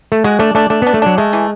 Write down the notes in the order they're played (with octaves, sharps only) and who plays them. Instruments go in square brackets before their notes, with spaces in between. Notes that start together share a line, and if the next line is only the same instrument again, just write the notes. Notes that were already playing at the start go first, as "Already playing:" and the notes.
[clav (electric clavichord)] A3
[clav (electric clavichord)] G#3 [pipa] F#4
[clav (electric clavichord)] A3 [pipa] D4
[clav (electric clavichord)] A3 [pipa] D4
[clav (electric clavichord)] A3 [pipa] D4
[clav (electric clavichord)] B3 [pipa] D4
[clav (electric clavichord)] A3
[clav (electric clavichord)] F#3 [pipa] D4
[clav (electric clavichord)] G#3 [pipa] A3
[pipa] E3